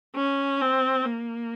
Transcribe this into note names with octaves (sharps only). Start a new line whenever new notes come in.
C#4
C4
A#3